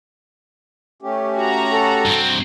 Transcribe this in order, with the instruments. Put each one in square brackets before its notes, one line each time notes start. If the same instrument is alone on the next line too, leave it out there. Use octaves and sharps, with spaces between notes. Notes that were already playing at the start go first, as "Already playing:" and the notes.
[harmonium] A3 C#4 G4
[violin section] F#4 A#5
[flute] A4
[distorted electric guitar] G2 C4